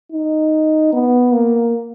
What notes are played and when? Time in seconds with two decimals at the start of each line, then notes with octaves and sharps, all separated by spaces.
0.12 D#4
0.93 B3
1.33 A#3